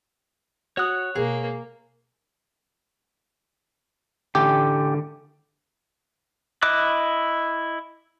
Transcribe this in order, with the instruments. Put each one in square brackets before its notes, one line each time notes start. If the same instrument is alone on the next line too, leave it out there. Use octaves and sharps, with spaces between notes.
[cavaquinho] F#4 D#6 [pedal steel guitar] C#5 F#6
[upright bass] B2 G#3 [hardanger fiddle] A#3 [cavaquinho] G#4
[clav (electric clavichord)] A1 G4 [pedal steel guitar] D3
[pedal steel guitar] E4 D#5 D6 F#6